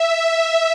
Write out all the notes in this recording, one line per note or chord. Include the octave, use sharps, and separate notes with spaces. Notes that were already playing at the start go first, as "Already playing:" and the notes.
Already playing: E5